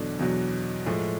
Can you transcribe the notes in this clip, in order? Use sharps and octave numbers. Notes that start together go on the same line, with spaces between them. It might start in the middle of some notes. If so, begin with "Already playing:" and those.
Already playing: E2 B2 D3 F#3 D4
E2 B2 F#3
A2 F3 G#3